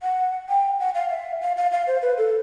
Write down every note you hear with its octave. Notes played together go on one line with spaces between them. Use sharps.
F#5
G5
F#5
F5
E5
F5
F5
F5
C5
B4
A4